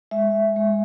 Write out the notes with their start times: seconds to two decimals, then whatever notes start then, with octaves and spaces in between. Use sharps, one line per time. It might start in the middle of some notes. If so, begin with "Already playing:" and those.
0.11 G#3 E5
0.56 G#3